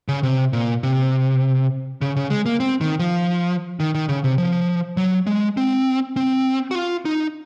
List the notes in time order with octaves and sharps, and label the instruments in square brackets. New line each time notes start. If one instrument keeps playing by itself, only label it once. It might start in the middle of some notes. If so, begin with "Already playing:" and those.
[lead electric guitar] C#3
C3
A#2
C3
C#3
C#3
G#3
A#3
C4
D#3
F3
D#3
D#3
C#3
C3
F3
F#3
G#3
C4
C4
F#4
F4
D#4